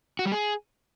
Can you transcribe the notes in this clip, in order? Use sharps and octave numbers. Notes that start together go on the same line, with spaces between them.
F#4
G3
G#4